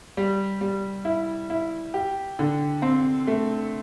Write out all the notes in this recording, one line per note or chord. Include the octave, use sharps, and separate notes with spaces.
G3
G3
E4
E4
G4
D3
C4
A3